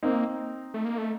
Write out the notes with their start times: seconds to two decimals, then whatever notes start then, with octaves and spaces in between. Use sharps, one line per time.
0.03 A#3 C4 D#4
0.74 A3
0.85 A#3
0.98 A3